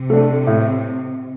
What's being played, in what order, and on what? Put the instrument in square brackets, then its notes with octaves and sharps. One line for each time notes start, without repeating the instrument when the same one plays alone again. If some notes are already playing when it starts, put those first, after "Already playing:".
Already playing: [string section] C3
[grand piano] A3 D4
A2